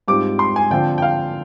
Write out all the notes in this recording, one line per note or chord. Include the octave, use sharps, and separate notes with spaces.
G#2 G3 C4 F4 D6
C6
G#5
D3 F3 C4 F4 G5
G5
F5